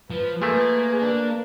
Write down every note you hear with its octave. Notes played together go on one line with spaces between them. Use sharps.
F3 B4
F3 A3 A#3 G#4
D4